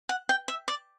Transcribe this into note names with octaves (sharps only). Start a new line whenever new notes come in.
F#5
G5
E5
D5